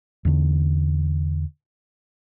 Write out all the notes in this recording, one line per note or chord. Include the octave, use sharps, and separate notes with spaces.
E2 D3